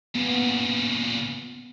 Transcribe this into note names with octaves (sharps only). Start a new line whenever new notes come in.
A#2 C#3 B3